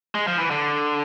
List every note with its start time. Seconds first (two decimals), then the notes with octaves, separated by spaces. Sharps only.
0.15 G#3
0.27 F3
0.38 E3
0.51 D3